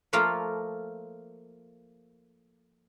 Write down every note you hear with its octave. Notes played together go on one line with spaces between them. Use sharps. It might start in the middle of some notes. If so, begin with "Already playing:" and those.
F3 A3 A#3 F4 A#4 F5